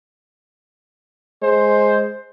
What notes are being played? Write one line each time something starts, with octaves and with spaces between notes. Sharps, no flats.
G#3 C5